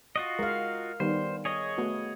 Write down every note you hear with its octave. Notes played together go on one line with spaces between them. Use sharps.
F4 F#4 D#5
G#3 A#4 F5
D#3 G3 B3 C5
G#4 C#5 D#5
A3 B3 F#4